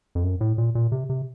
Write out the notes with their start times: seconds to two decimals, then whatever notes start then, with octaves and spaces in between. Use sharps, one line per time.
0.15 F2
0.24 F#2
0.41 A2
0.58 A#2
0.75 A#2
0.92 C3
1.10 C3